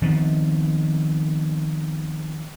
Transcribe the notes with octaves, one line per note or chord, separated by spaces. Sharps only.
D#3 F3 B3 C4